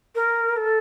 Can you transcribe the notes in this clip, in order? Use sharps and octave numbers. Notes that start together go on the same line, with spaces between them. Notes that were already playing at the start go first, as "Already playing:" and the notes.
A#4
A4